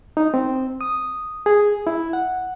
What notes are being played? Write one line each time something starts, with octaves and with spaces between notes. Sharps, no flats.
D#4
C4
D#6
G#4
E4
F#5